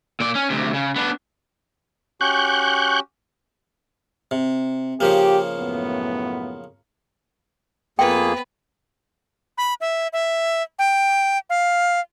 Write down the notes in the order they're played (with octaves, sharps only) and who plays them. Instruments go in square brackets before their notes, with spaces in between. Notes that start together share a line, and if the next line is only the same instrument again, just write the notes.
[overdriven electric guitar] A#2 D5
C#4
D2 C3
C#3
B3 D4
[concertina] C#4 F#4 G4 [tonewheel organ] C#6 F#6 G6
[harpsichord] C3
[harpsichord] C#3 F3 A#3 [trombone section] G4
[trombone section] F#2 A2 B3
[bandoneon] F2 A#3 G#4 [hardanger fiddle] B3 B4 [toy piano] G5
[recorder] B5
E5
E5
G5
F5